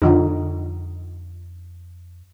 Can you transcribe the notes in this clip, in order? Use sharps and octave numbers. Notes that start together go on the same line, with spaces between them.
F2 D3 F3 D#4